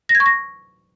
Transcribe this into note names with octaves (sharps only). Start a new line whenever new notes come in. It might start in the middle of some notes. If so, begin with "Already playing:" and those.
A#6
G#6
C#6
A#6